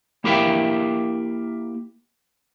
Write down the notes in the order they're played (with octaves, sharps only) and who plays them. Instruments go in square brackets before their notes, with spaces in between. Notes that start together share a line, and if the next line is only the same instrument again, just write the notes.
[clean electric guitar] A#3 E4 G4 A#4 E5 G5